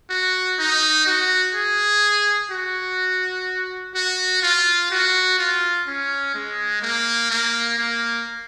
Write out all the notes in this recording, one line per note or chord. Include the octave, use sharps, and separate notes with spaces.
F#4
D#4
F#4
G#4
F#4
F#4
F4
F#4
F4
C#4
G#3
A#3
A#3
A#3